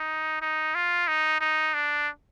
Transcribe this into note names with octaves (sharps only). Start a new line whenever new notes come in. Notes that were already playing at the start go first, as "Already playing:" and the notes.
Already playing: D#4
D#4
F4
D#4
D#4
D4